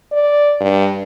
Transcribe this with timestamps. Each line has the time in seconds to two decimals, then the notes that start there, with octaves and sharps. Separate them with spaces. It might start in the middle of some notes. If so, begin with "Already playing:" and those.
0.12 D5
0.60 G2